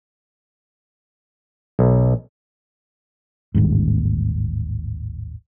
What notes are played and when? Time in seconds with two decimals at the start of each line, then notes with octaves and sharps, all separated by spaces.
1.79 B1
3.54 D#1 A1 D#2 G#2